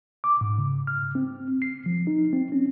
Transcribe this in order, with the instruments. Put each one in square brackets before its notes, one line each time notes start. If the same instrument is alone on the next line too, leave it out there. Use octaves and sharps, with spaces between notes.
[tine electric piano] D6
G#2
C#3
F6
C4
C7
F3
D#4
C4
C#4